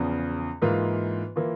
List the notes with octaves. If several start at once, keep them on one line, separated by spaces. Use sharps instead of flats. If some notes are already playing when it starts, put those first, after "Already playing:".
Already playing: E2 C#3 F3
G#2 E3 A#3 F4
E3 A#3 F4